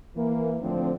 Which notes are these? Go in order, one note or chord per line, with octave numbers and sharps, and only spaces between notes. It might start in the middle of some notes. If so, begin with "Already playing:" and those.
E3 A#3
A2 D3 F3 A3 C4